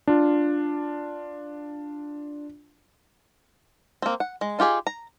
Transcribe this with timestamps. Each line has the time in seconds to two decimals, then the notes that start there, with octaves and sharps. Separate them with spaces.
0.08 D4 F4
4.02 A#3 C4
4.20 F#5
4.41 G#3
4.59 D#4 F4 G4 G#4 G#5
4.87 A#5